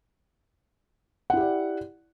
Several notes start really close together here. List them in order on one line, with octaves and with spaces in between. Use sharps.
F#5 E4 G4 D5